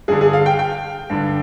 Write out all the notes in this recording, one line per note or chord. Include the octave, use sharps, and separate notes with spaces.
G2 D3 G#4
G#4
F5
G5
G5
G2 D3